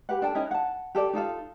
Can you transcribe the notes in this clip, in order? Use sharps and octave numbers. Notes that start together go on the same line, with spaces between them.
G4 B4 F#5
D4 A4 G5 A5
C#4 D#4 E4 D#5
F#5 A5
G4 A4 D5
D#4 F4 A4 F5